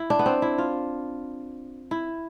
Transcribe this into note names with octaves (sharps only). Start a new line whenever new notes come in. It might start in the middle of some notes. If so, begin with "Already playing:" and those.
Already playing: E4
D4
B3
C4
E4
F4
E4